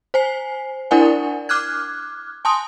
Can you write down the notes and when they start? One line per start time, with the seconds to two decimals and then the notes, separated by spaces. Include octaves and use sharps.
0.14 C5 G#5 C7
0.91 D4 E4 A#4 D5 F#5 G#5
1.49 D6 F6 F#6 G#6
2.45 G#5 A5 C6 D#6